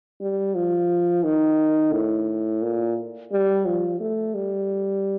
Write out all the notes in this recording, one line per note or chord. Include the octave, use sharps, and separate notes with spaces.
G3
F3
D#3
A2
A#2
G3
F3
A3
G3